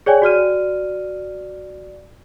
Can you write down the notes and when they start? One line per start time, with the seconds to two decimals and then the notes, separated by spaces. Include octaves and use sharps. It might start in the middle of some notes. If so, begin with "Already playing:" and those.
0.06 G#4 C#5 D5 G5 G#5
0.22 F#4 D5 F6 D#7